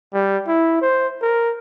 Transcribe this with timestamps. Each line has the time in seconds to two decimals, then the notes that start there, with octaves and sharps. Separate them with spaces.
0.13 G3
0.47 E4
0.81 C5
1.22 A#4